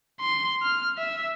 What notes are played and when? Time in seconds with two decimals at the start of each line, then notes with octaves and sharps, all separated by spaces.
0.20 C6
0.63 F6
0.98 E5